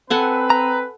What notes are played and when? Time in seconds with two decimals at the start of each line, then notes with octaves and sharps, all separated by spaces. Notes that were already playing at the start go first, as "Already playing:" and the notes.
0.10 C4 A4 B4 F#5 G#5
0.50 A#5